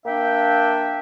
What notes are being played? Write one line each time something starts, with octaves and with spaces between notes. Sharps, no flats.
A#3 D4 E5 G5